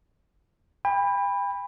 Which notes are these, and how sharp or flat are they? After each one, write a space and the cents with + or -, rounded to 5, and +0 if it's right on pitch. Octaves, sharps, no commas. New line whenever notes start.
G5 +40 B5 +0